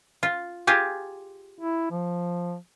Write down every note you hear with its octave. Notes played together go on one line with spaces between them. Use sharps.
F4
F4 G4 G#4
E4
F3